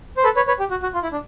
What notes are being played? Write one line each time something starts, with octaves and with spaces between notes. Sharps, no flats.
C5
A4 B4
B4 C#5
B4 C#5
G4
F#4
F#4
F4
E4
D4